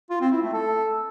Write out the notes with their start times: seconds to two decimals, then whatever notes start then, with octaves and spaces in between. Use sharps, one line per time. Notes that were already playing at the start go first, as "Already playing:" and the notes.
0.10 F4
0.21 C4
0.32 E4
0.43 A3
0.53 A4